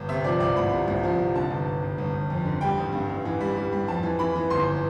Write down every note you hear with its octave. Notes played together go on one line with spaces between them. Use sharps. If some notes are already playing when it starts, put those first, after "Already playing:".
Already playing: G1
C3 E5
F3 D5
C2 D5
C2 B5
C3
C2
F3
C3
D3 A5
G1
G1
G1
G1
G1
F2
D3
G3 G5
A1
G2
A1
E3
G3
G3
G3
F2 A5
E3
E3 B5
E3
G1 C6